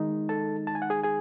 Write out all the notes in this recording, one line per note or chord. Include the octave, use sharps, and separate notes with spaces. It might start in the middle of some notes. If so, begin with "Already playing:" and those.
Already playing: D#3 G#3 D#4
A4 A5
A5
G#5
F#5
G#4 G#5
G#4 G#5